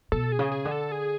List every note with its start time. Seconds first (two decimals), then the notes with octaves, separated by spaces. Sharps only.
0.12 B2 A4
0.32 G#4
0.39 C#3
0.52 G#4
0.65 D3
0.72 A4
0.92 G#4